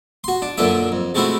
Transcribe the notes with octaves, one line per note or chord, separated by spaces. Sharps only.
F#4 C6
D4
F#2 A#2 D3 D4 E5
F2
G#3 A3 C4 E4 F#4